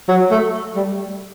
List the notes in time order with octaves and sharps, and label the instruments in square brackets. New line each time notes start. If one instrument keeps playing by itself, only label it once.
[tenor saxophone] F#3
A3
G3